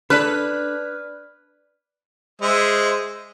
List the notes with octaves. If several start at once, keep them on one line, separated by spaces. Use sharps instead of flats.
D4 A4 B4 D5 F6
G#3 C5 E5